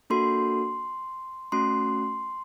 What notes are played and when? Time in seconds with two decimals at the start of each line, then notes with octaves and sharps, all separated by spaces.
0.10 A#3 D4 F#4 A4 C6
1.52 A3 C#4 F#4 C6